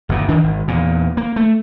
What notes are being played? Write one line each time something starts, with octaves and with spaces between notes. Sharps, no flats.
G1 D2 A#2
D#3 E3 D4
G#1
E2 A#2
A#3
A3